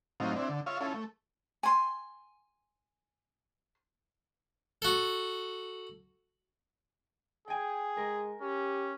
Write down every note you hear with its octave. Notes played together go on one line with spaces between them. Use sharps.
A2 F#3 C4 D#4 F4
C4 D4 E4
D3
F4 C#5 E5 F5
C#4 E4 F4 A4
A3
G#5 C6
F#4 A4
G#4 G5 G#5
G#3 A#4
C#4 G4